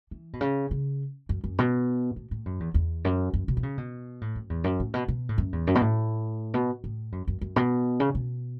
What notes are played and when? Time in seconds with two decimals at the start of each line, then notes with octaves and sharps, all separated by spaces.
0.11 E3
0.33 B2
0.41 C#3
0.71 C#3
1.29 F#2
1.44 F#2
1.59 B2
2.16 A2
2.31 A2
2.46 F#2
2.60 E2
2.74 E2
3.05 F#2
3.34 F#2
3.48 B2
3.57 E3
3.63 C#3
3.78 B2
4.21 A2
4.35 F#2
4.50 E2
4.64 F#2
4.80 A2
4.94 B2
5.08 B2
5.29 A2
5.38 F#2
5.53 E2
5.67 F#2
5.75 B2
5.82 A2
6.54 B2
6.84 A2
7.12 F#2
7.28 F#2
7.41 F#2
7.56 B2
8.00 C#3
8.15 B2